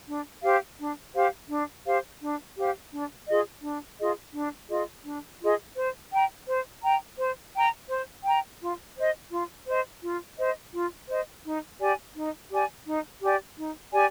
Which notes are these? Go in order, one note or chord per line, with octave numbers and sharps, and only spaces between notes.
D4
G4 C5 F5
D4
G4 C5 F5
D4
G4 C5 F5
D4
G4 C5 F5
D4
F4 G#4 D#5
D4
F4 G#4 D#5
D4
F4 G#4 D#5
D4
F4 G#4 D#5
C5
G5 A#5
C5
G5 A#5
C5
G5 A#5
C5
G5 A#5
F4
C5 D#5
F4
C5 D#5
F4
C5 D#5
F4
C5 D#5
D#4
G4 D5 G#5
D#4
G4 D5 G#5
D#4
G4 D5 G#5
D#4
G4 D5 G#5